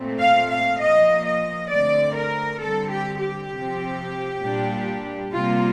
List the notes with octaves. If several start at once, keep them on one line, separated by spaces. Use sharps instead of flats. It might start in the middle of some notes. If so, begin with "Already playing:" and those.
Already playing: A#2 A3 C4
F5
F5
A#2 F3 A#3 D#5
D#5
D3 A3 C4 D5
A#4
D3 G3 C4 A4
G4
G4
C3 F3 C4
A#2 G3 D4
C3 G3 A#3 F4